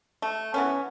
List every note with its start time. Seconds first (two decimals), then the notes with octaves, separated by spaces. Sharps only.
0.22 A3
0.54 E3 B3 C#4